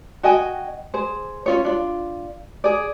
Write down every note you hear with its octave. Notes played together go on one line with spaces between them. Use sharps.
F#4 D#5 G5 G#5
G#4 C5
C#4 F4 C#5
D4 F4
G#4 D5